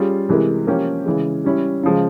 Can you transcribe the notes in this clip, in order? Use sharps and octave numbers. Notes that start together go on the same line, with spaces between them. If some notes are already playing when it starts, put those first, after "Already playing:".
Already playing: G3 C#4 F4 G#4
C3 E3 G#3 E4 A#4
F3 A#3 C#4 G4
C#3 E3 G#3
G3 C#4 E4
C#3 F3 G#3